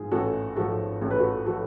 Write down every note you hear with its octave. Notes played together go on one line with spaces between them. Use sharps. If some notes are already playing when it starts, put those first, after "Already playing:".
Already playing: G#2 F3 G#4
A1 F#4 A4
G#2 F3 F#4 A4
A1 A4
B4
F#4 A4
F3 F#4 A4